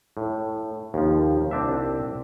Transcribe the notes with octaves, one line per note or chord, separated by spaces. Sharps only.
A2
D#2 F3
C2 C4 D4 E5